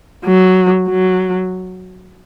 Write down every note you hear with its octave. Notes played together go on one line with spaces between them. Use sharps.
F#3
F#3